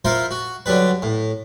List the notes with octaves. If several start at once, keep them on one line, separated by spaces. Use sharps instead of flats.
E4 F4 A#4 C5 F5
F#4
D3 F#3 G3 B4
A2